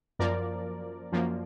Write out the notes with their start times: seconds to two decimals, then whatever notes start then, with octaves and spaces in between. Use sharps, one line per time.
0.19 F#2 F3 A#3 A#4 D5
1.12 F#2 F3 A#3